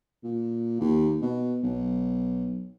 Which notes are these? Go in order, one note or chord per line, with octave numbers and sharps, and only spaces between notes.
A#2
D#2
B2
B1